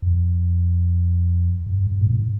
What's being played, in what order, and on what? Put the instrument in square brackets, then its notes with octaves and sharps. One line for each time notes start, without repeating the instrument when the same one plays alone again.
[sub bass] F2
G2
G2
A#2
G#2